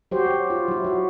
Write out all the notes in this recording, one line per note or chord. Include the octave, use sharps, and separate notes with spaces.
F#3 F#4 G4 C5
F#3
F4
F#3 E4
F#3 F#4